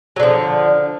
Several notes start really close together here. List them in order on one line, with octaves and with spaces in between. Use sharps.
F#3 D3 F3